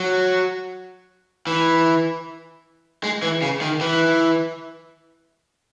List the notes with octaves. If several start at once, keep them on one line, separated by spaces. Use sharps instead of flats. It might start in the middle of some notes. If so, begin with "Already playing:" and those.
Already playing: F#3
E3
G#3
E3
C#3
D#3
E3